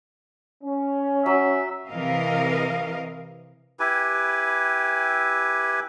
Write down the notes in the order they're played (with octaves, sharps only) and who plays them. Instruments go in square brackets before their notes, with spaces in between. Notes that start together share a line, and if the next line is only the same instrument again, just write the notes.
[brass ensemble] C#4
[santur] F#3 [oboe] E5
[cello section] C3 E3 A#4 D#5 F5
[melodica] E4 G4 B4 G#5